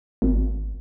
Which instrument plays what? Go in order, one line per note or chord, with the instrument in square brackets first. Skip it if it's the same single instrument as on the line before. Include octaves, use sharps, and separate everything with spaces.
[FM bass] G#1